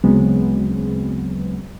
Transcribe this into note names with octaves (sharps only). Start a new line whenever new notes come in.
D2 C#3 F#3 G#3 B3 C4